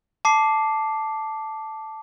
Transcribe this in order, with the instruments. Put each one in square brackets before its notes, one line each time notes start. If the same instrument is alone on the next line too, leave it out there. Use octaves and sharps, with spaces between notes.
[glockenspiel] A5 D6 C7